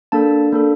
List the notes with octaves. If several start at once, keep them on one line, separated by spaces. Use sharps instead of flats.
A#3 D4 A4 A5
A#3 D4 A4